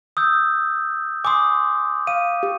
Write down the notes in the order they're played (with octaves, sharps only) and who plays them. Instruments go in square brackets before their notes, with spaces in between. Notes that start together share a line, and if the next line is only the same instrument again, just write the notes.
[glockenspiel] D#6 E6 G6
[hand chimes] G#5 C6 [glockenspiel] D6 D#6
[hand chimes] F5 [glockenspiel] D#7
[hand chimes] G4